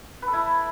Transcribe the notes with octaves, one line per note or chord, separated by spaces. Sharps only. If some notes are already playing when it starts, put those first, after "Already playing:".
B4
A4
E4